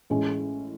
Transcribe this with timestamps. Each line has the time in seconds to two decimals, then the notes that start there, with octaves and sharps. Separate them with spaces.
0.10 A1 A2 G#3 C#4